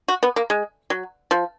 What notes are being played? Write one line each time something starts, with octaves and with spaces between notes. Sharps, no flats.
F#4
B3
A#3
G#3
F#3
F3